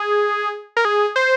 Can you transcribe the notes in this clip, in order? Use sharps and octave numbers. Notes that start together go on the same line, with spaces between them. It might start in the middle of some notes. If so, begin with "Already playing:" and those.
Already playing: G#4
A#4
G#4
C5